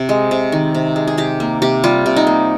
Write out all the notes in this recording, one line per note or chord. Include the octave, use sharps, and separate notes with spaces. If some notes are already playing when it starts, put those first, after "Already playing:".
Already playing: C3
G#3
C3
D#3
C3
G#3
G#4
C3 G4
A#3
C3 G4
G3 F4
C3
D#4
A#3